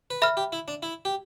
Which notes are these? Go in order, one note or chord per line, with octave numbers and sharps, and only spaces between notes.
B4
A4 E5 B5 F6
G4
E4
D4
E4
G4